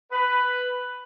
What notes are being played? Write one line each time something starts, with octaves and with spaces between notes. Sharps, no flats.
B4